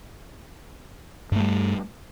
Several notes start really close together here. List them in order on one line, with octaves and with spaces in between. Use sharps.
G2 A3 G3